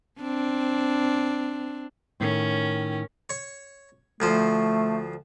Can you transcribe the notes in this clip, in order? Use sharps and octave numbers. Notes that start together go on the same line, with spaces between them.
C4 D4
A2 D#3 C#4 A#4
C#5 C#6
D2 F3 A3 C5